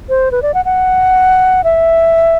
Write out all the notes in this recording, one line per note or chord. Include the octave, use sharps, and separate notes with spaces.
C5
B4
D5
F#5
F#5
E5